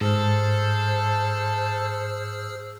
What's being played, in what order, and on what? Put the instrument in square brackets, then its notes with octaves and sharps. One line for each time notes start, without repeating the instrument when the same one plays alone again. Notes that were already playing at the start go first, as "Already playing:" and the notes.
[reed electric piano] G#2 [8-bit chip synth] G#4 E6 F6 [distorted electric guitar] A4 [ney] C5